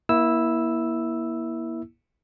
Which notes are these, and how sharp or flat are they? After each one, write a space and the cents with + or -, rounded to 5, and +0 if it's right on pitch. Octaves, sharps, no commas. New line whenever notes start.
A#3 +30 E4 -10 E6 +0